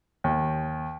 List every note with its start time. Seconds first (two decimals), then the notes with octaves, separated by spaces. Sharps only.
0.24 D#2